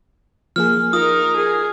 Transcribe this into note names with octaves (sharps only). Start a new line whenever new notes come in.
F3 A#3 G#4 F6
D#4 F4 A#4 D#6
G#4